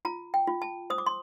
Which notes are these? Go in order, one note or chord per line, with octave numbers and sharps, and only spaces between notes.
F4 A#5
G5
F4
A5
C5 D#6
D6
C6